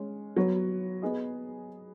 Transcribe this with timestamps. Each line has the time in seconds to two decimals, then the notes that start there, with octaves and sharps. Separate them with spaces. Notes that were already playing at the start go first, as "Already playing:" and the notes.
Already playing: G#3 C#4
0.37 F#3 B3 F#4 C#5
1.02 B3 G#4 D#5